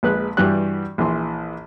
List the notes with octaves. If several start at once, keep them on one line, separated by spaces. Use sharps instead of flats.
A#1 G#3 B4 F#6
G2 E3 G3 F#4 D5 F#6
A#1 E3 C6